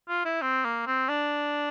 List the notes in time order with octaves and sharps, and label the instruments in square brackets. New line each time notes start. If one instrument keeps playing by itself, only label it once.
[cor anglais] F4
E4
C4
A#3
C4
D4